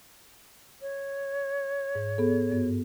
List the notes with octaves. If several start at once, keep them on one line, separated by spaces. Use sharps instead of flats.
C#5
G#2
B3 G#4 A4
G2 B3 F#4